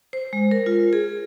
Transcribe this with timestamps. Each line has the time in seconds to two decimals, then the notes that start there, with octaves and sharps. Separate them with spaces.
0.13 C5
0.33 G#3
0.51 A#4
0.66 F4
0.93 G#4